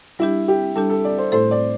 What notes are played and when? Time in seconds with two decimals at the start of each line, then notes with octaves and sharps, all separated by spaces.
0.19 G3 D4 E4 G4
0.48 G4
0.75 G3 D4 G4 A4
0.90 A4
1.05 D5
1.18 C5
1.32 A2 A3 E4 A4 C5
1.51 D5